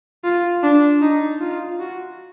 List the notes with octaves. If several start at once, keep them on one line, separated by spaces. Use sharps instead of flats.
F4
D4
D#4
F4
F#4